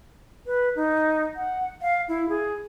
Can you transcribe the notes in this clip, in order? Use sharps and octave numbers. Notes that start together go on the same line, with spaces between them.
B4
D#4
F#5
F5
E4
G#4